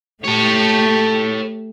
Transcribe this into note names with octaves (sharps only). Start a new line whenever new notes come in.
A3 G4 A4 C#5